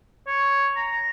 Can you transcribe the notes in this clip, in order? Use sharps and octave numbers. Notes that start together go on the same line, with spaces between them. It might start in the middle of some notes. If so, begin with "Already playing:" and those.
C#5
A#5